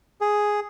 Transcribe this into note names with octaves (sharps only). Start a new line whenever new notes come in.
G#4